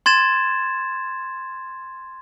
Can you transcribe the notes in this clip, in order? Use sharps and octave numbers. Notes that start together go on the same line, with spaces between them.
C6 G#6 A6 E7